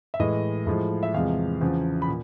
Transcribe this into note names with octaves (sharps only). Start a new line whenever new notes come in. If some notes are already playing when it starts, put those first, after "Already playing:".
E5
A2 E3 G#3 D#5
A2 F3 G#3
E5
E2 C3 F3 G#3 F5
E2 C#3 F3
B5
A#2